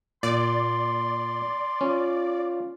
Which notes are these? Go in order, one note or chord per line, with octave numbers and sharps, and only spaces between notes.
A#2 D5 C6
C#4 F4